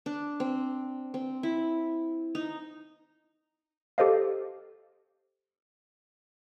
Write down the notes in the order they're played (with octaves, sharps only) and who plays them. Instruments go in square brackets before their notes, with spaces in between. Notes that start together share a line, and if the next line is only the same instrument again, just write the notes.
[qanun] D4
C4
C4
E4
D#4
[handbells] G4 A4 C5 D#5 F5